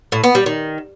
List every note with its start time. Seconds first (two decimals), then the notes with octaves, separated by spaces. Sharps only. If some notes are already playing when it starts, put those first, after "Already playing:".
0.12 A2
0.24 B3
0.35 G3
0.46 D#3